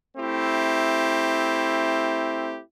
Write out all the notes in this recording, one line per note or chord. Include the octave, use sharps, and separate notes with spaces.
A3 C4 E4 G4